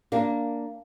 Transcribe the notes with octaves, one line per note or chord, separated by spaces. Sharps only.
A#3 D4